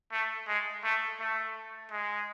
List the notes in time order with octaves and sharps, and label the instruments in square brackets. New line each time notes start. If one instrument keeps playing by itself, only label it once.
[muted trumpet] A3
G#3
A3
A3
G#3